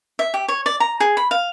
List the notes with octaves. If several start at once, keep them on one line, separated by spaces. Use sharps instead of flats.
E5
G4
C#5
D5
A#5
G#4
B5
F5